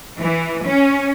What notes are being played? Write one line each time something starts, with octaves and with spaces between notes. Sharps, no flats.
E3
C#4